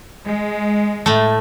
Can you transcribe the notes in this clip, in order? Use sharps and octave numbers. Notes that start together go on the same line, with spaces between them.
G#3
A2 A3